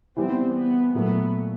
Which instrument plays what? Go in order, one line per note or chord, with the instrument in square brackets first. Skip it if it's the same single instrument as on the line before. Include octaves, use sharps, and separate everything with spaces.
[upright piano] E3 G3 B3 [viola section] C4
[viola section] B3
[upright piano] A#2 F#3 A3 [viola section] B3